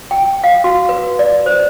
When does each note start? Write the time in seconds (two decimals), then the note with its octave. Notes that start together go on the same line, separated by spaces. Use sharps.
0.11 G5
0.44 F5
0.64 F#4
0.89 B4
1.19 D5
1.46 C5